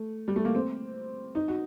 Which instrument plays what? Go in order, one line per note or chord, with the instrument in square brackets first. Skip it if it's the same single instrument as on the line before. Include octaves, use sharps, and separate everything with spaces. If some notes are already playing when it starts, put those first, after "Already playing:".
Already playing: [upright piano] A3
G3
A3
A#3
C4
D#4
F#4